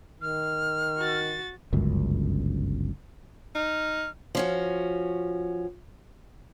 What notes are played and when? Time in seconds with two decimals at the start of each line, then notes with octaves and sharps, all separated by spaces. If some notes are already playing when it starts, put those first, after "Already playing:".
0.22 D#3 F6
0.98 F#4 A6
1.73 G1 C#2 F#2
3.55 D#4 F6
4.35 F3 C#4 F#4